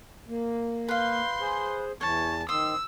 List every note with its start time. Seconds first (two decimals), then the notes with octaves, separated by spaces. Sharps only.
0.28 A#3
0.88 B4 F5 C6 G6
1.41 G#4 C5
2.01 E2 E3 C#5 A5
2.49 D#3 C5 C6 D#6 E6